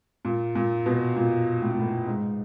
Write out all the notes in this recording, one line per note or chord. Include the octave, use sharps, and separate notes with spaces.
A#2
A#2
B2
A#2
A2
A#2
A2
G#2